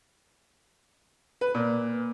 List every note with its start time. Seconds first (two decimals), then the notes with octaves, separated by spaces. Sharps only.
1.41 B4
1.55 A#2